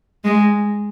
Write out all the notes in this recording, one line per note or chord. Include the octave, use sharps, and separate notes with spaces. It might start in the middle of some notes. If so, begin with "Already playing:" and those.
G#3